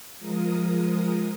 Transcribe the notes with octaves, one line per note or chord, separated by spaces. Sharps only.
F3 G#3 A#4 D#6